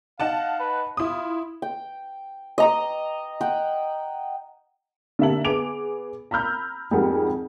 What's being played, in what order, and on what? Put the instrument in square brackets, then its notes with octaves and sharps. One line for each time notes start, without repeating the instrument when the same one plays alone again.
[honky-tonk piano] D#4 F#5 A5 [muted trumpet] F5
[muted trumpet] B4
[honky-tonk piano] E4 D#6 [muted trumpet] F4
[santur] G5
D#5 A#5 D#6
F#5 G5
[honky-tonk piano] D3 A#3 G4 E5 A5 F#7
B3 G#4 D6 D7 F7
A#5 B5 E6 F6 G6
F2 G#2 G3 G#4 A#4 F#5